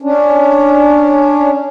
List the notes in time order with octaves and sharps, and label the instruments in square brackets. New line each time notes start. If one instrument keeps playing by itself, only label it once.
[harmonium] C#4 D4